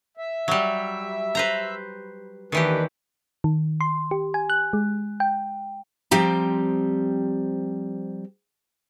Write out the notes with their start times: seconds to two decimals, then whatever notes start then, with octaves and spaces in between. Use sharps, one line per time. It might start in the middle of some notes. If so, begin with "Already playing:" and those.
0.17 E5
0.48 F#3 G3
1.35 B4 C5 A#5
2.52 D#2 D#3 E3 D4 G4 B4
3.44 D#3
3.81 C6
4.11 G4
4.34 G#5
4.50 F#6
4.73 G#3
5.20 G5
6.11 F3 G3 C4 G4 A#5